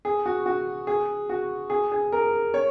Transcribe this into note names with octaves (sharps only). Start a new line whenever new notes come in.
G#4
F#4
F#4
G#4
F#4
G#4
G#4
A#4
C#5